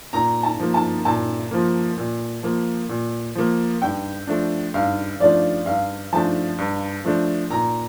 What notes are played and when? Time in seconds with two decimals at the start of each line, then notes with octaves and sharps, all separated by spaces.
0.13 A#2 A#5
0.43 A5
0.60 F3 A#3
0.74 A5
1.05 A#2 A5
1.51 F3 A#3
1.98 A#2
2.43 F3 A#3
2.89 A#2
3.35 F3 A#3
3.82 G2 G5
4.27 F3 A3 D4
4.74 G2 F5
5.20 F3 A3 D4 D5
5.66 G2 F5
6.13 F3 A3 D4 A5
6.58 G2
7.05 F3 A3 D4
7.50 A#2 A#5